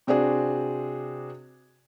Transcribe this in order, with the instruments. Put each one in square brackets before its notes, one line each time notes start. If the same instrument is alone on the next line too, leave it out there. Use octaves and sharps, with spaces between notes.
[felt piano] C3 C4 D4 F#4 G#4